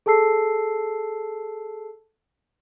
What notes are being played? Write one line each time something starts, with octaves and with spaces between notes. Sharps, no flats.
G#4 A4 A5 E6 C7